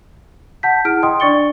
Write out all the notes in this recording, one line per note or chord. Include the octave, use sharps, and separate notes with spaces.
F#5 A5 G6 B6
E4 G#4 F6 D7
D#5 G5 C6 D#6
D4 D5 C#6 A6 C#7 G7